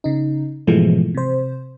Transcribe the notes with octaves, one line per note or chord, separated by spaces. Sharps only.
C#3 D#4
G#2 B2 E3 F3 G#3 A3
C3 C5